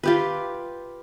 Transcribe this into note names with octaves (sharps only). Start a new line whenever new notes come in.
F4 G4 B4